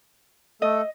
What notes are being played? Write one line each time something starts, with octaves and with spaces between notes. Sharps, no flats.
A3 A4 D#5